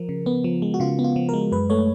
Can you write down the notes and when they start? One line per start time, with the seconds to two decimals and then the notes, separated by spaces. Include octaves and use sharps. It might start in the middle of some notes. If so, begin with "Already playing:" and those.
Already playing: F3 A#4
0.09 C#3
0.26 B3
0.44 F3
0.62 G#3
0.74 F#4
0.80 C#3 F4
0.99 B3
1.04 F4
1.16 F3
1.29 G#3 A#4
1.52 F#2 B4
1.70 A3 C#5